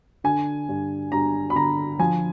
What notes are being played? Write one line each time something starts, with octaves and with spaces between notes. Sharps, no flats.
D3 G#5
G2
G2 A#5
B5
D3 A#5
F3 G#5